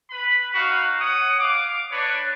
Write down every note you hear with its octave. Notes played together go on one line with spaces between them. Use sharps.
B4 B5
D#4 F#4 F5
C#5 F#5 D#6
F5 D6
D4 B4 C#5